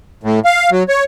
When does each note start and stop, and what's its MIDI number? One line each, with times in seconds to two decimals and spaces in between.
0.23 0.39 45
0.45 0.70 77
0.71 0.83 54
0.89 1.04 73